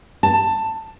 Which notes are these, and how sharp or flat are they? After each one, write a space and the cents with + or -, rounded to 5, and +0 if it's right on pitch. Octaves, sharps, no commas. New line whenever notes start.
A5 +15